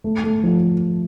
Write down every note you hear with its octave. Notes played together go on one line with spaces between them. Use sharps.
A3
A3
F3